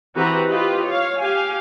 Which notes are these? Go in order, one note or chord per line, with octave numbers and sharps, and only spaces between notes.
E3 C4 F#4 G4 B4 A#5
F4 G4 B4 D#5
C#5 F5
G4 F5 G#5